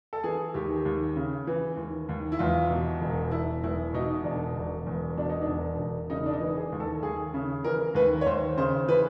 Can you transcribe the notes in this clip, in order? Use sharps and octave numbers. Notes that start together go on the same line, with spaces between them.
A4
E3 G#4
D#2 G4
D#2
C#3
E3
D#2
D#2
E4
E2 F4
B2
E1
E1 E4
E2 E4
B2 D#4
E1 D4
E1
E2
B2 D4
D#4
D4
E1
E1
C#3 D#4
D4
D#4
E3
G#4
D#2
A4
D#2 G#4
C#3
E3 A#4
D#2 B4
C#5
D#2 C5
C#3 C5
E3 B4